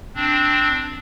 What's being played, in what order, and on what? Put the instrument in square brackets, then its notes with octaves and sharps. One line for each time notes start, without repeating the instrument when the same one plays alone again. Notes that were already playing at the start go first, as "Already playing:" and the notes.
[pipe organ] C4 D4